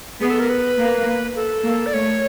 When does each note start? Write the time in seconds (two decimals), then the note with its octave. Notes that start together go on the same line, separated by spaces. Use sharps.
0.21 B3 G#4
0.30 A4
0.40 A#4
0.49 B4
0.78 A#3
1.36 A4
1.64 A#3
1.86 D5
1.93 A3 C#5